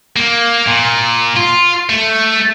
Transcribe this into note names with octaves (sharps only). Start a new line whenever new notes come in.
A#3
A#2
F4
A3